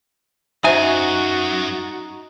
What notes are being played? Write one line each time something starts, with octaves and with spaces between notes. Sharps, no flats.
F#2 D#4 F#4 C5 E5 G#5